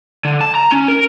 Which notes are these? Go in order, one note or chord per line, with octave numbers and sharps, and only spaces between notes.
D3
A5
A#5
C#4
A#4